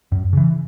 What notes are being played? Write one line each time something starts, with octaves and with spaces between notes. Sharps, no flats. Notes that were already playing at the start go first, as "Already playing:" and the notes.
F#2
C#3 E3